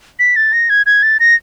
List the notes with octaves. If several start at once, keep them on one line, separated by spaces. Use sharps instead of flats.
B6
A6
A#6
G#6
G#6
A6
A#6